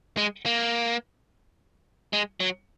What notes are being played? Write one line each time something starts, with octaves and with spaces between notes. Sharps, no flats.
G#3
A#3
G#3
F#3